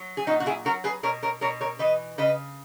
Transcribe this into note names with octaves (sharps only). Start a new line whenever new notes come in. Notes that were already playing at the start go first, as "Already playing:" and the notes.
Already playing: F#3
G#4
A#2 D#4 F#4
F#4
E4 G#4
F#3 F#4 A#4
G#4 B4
B2 A#4 C#5
A#4 C#5
B2 A#4 C#5
A#4 C#5
E3 B4 D#5
C#3 B4 D#5